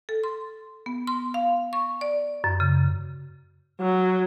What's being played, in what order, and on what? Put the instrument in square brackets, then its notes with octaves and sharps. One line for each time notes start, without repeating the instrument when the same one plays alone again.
[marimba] A4
C6
B3
C6
F5
C#6
D5
F#2
C#3
[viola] F#3